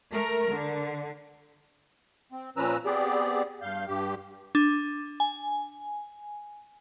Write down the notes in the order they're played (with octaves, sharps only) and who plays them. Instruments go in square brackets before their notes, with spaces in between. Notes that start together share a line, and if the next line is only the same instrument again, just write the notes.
[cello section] A3 A#4
D3
[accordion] C4
A#2 F3 C#4 B4 A#5 E6
B3 C4 G4 G#4 D5
G2 F5 G6
G2 G4
[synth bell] D4
G#5